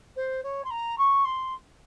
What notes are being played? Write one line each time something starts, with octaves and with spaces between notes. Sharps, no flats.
C5
C#5
C6
A#5
C#6
C6